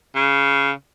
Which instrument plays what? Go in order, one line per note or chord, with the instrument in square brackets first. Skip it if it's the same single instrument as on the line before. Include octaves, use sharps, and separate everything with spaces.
[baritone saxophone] C#3